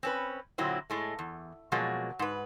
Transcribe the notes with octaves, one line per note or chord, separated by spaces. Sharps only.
C4 C#4 B4
A#2 D3 F#3 C4 E4
A2 G#3 A3
E2
B2 F3 F#3 G#3 A#3
G#2 B4